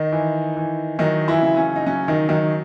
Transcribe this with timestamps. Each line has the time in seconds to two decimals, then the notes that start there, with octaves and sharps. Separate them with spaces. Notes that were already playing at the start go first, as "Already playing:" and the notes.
Already playing: D#3 D#4
0.12 E3
0.56 E3
0.99 D#3 F#3 D#4
1.28 E3 E4
1.42 C#3
1.57 C#4
1.76 D#4
1.86 F#3 C#4
2.08 D#3 D#4
2.29 D#3 F#3 D#4